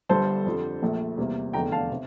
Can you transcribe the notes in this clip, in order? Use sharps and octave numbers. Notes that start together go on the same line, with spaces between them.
G1 G2 D3 G3 A4 C5
F2 D3 G3
A#1 A#2 A3
E2 C3 G3 A#3
F1 E2 D3 G5 A#5
F5 A5
C3